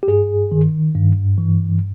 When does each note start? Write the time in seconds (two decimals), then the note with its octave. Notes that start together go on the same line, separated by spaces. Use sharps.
0.03 G4
0.08 G2 G#4
0.52 D#3
0.95 G2
1.38 E3